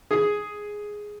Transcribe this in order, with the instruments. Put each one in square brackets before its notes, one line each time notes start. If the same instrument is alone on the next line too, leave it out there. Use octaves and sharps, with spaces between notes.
[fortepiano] G#4